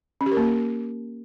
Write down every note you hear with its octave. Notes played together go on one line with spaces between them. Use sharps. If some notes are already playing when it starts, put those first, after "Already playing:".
C#4
G4
A#4
A#3